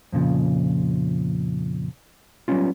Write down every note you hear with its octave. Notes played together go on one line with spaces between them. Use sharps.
F2 A#2 C#3 F3
F#3 G3 B3 C#4 F4